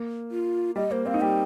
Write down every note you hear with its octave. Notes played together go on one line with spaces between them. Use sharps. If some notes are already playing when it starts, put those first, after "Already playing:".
Already playing: A#3
F4
G3 D#5
A#3 C5
C4 F5
D#4
G3 C4 G5